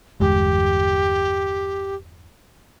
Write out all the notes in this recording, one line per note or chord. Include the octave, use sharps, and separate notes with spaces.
G1 E2 G#3 G4